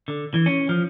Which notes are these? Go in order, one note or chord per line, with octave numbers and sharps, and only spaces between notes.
D3
E3
C#4
F3